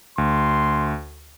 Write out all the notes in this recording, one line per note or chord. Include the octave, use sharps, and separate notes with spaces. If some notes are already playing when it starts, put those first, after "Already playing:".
D2 C6